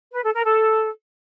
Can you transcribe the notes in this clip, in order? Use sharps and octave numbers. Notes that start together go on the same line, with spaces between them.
B4
A4
A#4
A4